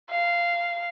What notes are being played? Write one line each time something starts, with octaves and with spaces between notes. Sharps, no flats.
F5